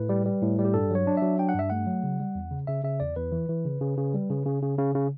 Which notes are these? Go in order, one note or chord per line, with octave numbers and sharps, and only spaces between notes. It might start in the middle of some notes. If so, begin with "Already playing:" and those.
Already playing: A2 B4
G3
G3
A2
G3
G4
G2 A4
F#3 C#5
D4
F#3 E5
D4 G5
F#5
G2 E5
A3 F#5
F#3
C#3
G3
E2
C#3
C#3 E5
C#3 E5
E2 D5
E2 B4
E3
E3
C#3
C#3
C#3
G3
C#3
C#3
C#3
C#3
C#3